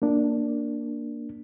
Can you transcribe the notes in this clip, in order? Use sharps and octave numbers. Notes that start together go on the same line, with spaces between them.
A#3 D4